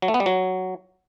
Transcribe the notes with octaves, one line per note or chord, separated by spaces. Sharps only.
F#3
A3
B3
G3
F#3